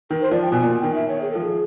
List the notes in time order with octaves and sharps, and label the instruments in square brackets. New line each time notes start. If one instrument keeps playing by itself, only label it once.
[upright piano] D#3 [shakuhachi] A#4
[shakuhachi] C5
[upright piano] F3 [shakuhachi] D5
[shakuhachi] G5
[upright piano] B2 [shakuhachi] G#5
[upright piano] A#2
[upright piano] D#3 [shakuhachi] G5
[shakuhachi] E5
C#5
G#4
A4
[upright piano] F3
[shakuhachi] G#4